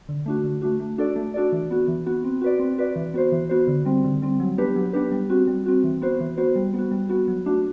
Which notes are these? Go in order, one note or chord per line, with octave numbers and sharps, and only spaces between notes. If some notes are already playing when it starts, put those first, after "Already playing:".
D3
A3 D4 F#4
D3
A3 D4 F#4
A3
D4 F#4 A4 D5
A3
D4 F#4 A4 D5
E3
B3 F#4
E3
B3 F#4
C4
F#4 B4 D5
C4
F#4 B4 D5
E3
B3 F#4 C5
E3
B3 F#4 C5
D3
G3 C4
D3
G3 C4
F#3
B3 D4 G4 B4
F#3
B3 D4 G4 B4
G3
C4 F#4
G3
C4 F#4
E3
B3 F#4 C5
E3
B3 F#4 C5
G3
B3 F#4
G3
B3 F#4
F#3
A3 D4 F#4